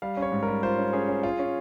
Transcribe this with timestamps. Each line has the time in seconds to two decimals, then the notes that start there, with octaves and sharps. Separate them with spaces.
0.02 G3 F5
0.17 C#4
0.22 C#5
0.32 G#2
0.43 A#4
0.48 G3
0.63 F4 C5
0.78 C#4
0.93 C#4 G#4
1.09 C#4
1.23 F4
1.39 C#4